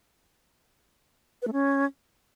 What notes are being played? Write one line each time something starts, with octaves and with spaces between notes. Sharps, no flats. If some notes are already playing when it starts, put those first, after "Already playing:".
B4
A3
C#4